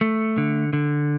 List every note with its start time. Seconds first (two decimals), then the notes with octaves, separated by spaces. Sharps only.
0.01 A3
0.38 D3
0.73 D3